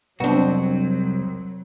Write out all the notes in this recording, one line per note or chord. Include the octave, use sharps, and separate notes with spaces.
C2 F2 F#3 B3 C4 D4 F#4